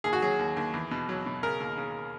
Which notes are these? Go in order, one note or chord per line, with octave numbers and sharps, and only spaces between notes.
D#2 G#4
F#4
F#3 G#4
D#2
D#2
E2
B2
F#3
B2
C#3 A#4
D#2
C#3